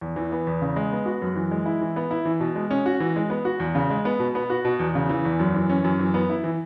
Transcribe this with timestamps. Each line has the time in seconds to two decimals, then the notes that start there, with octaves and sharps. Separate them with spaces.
0.01 E2
0.16 E3
0.32 B3
0.47 E2
0.62 C#3
0.76 G#3
0.92 B3
1.06 F#4
1.22 F#2
1.36 E3
1.51 G#3
1.66 E4
1.81 E3
1.96 B3
2.11 E4
2.25 E3
2.40 B2
2.56 G#3
2.71 C#4
2.86 F#4
3.00 E3
3.16 G#3
3.30 B3
3.45 F#4
3.60 E2
3.75 C#3
3.90 G#3
4.05 B3
4.20 B2
4.35 B3
4.50 F#4
4.65 B2
4.79 E2
4.95 C#3
5.09 E3
5.25 E2
5.40 F#2
5.55 E3
5.70 C#4
5.84 F#2
5.99 E3
6.14 B3
6.29 E4
6.44 E3